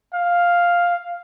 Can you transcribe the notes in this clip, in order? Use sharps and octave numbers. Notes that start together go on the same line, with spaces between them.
F5